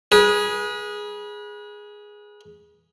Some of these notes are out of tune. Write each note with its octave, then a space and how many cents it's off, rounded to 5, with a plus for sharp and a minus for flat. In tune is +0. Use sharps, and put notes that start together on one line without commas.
G#4 +0 B4 -35